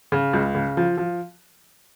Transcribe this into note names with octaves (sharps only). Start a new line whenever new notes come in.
C#3
C#2
C#3
F3
F3